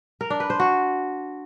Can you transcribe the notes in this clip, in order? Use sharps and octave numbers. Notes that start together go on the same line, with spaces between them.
A#4
D4
B4
C5
F#4